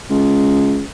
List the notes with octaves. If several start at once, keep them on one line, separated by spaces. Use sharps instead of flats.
C#2